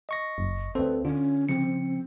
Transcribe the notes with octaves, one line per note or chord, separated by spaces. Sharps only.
D#5 C#6 A#6
F#1
D2 C4 A4 B4
D3 C#4 F4
C#3 F3 C4 C#7